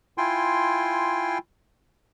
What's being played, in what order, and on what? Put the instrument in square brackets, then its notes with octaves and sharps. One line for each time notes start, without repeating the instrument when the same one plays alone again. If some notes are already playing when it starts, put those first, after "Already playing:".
[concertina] E4 F4 G5 G#5 C6